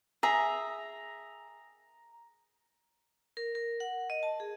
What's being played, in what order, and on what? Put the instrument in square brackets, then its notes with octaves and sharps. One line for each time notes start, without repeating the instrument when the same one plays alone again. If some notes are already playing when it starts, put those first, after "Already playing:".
[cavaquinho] G#4 E5 [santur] A#5
[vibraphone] A#4
A#4
F#5
D#5
A5
G#4